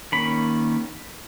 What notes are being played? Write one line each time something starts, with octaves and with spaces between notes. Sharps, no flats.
D#3 A#3 C#4 B5